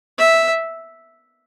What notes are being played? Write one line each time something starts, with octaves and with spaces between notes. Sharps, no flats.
E5